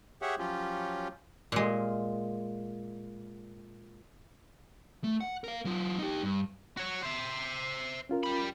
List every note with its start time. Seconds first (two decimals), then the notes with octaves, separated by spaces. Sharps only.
0.22 G4 G#4 C#5 E5 F#5
0.39 F3 F#3 C#4 F4 G4
1.52 A#2 G#3
5.04 A3
5.21 F#5
5.44 A#4 F5
5.65 F#3 F4
5.99 D#4 G4
6.23 G2
6.77 F#4 C#5
7.03 C5 E5
8.09 C#4 F4 A#4
8.24 G3 B5